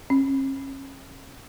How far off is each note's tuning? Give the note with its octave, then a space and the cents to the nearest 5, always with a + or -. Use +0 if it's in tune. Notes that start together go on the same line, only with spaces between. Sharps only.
C#4 -35